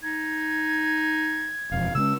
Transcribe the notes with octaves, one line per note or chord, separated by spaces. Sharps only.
D#4 G#6
E1 F2 F5
C#3 G#3 C#4 E6